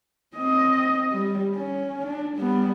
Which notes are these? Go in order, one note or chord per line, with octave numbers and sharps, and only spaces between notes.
C4 D#5
G3
C#4
D4
G3 B3